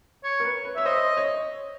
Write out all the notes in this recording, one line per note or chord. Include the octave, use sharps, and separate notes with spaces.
C#5
A#4
B4
B4
C#5 E5
C5 D#5
C#5